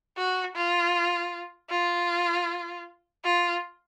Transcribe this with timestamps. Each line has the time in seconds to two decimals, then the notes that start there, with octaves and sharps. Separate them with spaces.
0.18 F#4
0.56 F4
1.70 F4
3.25 F4